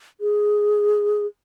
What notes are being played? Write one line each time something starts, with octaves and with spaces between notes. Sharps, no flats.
G#4